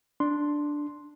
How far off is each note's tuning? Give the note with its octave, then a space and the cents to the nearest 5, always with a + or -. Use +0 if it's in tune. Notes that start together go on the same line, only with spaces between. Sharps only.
D4 +0 C6 +0